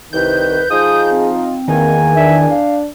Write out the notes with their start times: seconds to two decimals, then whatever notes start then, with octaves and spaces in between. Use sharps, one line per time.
0.13 C2 D#3 B4 G6
0.70 F3 D#4 F4 G#4 D#6
1.10 C4
1.68 E2 D#3 A#3 G#5
2.16 D4 E5
2.50 F5